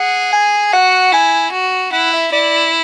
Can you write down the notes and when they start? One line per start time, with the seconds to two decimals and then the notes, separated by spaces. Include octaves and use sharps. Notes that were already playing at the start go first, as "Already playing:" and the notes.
Already playing: G#4 F#5
0.33 G#5
0.73 F#4 F#5
1.12 E4 G#5
1.52 F#4
1.92 E4 F#5
2.13 E5
2.32 E4 D5